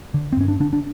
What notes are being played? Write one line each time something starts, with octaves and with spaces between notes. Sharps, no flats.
D3
C4
G2 C#4
D4
D3 D4
D4